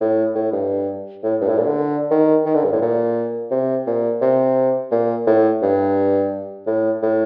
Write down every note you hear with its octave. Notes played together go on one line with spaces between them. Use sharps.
A2
A2
G2
A2
G2
A2
A#2
D3
D#3
D#3
D3
G2
A2
A#2
C3
A#2
C3
A#2
A2
G2
A2
A2